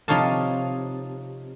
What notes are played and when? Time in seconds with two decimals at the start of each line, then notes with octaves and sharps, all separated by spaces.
0.08 C3 F3 D#4 C#5 F5 A5